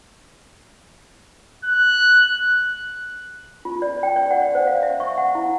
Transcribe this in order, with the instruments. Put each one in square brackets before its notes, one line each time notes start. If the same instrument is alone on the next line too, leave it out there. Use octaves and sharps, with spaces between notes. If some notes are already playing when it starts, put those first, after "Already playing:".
[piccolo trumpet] F#6
[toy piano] F4
D5
G5
D5
F#5
D5
C5
F5
E5
C#6
F#5
E4